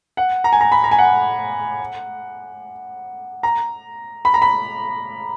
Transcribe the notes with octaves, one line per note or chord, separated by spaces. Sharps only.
F#5
A#5
G#5
A#5
B5
A#5
G#5
F#5
A#5
B5
A#5
B5